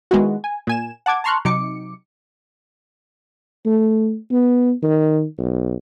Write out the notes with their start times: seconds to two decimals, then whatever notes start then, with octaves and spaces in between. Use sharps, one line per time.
0.11 D#3 G#3 B3 E4 F#4
0.44 G#5
0.67 A#2 G#5 E7
1.06 F#5 A5 D6 G#6
1.24 A5 A#5 C6 C#6 F6 F#6
1.45 C3 F#3 D#4 D6 C#7
3.66 A3
4.31 B3
4.83 D#3
5.38 B1